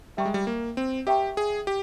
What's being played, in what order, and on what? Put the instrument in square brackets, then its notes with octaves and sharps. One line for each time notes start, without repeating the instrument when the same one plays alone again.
[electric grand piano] G3 [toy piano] A#4 E5 G5 A#5 C#6
[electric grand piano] G#3
G3
A#3
C4
[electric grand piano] G4 [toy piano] A#4 E5 G5 A#5 C#6
[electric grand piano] G#4
G4